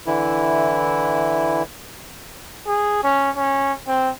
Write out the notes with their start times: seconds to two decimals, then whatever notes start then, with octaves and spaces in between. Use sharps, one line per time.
0.06 D3 E3 E4
2.67 G#4
3.03 C#4
3.36 C#4
3.87 C4